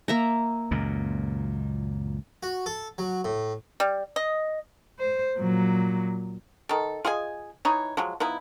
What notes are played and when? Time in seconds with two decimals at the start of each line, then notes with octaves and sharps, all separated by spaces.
0.08 A#3 E5 A#5
0.71 C#2 F#2 A#2
2.43 F#4
2.66 A4
2.98 F#3
3.25 A2
3.80 G3
4.16 D#5
4.99 C5
5.39 A#2 F#3
6.69 D#3 A4
7.05 F4 G#4 D#5 G#5
7.65 E3 D#4 C#5
7.97 F3 F#3 G#3
8.20 F3 B3 D#4 E4